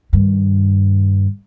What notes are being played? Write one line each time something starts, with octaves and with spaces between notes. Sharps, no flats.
G2 D#3